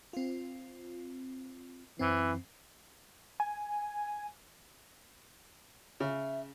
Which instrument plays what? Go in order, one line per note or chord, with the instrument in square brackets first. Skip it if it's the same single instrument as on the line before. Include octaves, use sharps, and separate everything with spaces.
[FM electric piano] C4 F4
[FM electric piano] F#2 C4 [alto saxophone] E3
[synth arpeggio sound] G#5
[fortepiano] C#3 [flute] E5